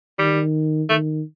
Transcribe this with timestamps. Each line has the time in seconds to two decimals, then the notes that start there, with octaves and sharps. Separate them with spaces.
0.19 D#3 G3
0.89 D#3 A3